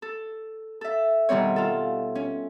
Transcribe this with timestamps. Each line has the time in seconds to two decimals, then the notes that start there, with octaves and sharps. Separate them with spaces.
0.02 A4
0.81 A4 E5
1.29 B2 D#3 G3 C4 C#5
1.56 F4 A4
2.15 C#4